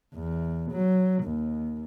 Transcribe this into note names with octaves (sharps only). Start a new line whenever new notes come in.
E2
F#3
D#2